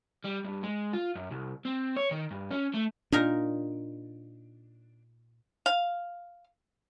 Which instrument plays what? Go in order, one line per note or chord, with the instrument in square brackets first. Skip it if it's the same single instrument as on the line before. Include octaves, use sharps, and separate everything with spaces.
[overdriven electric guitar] G3
G2
G#3
F4
F#2
C2
C4
C#5
D#3
G2
C#4
A3
[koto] A#2 D#4 A#4 [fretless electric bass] D4
[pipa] F5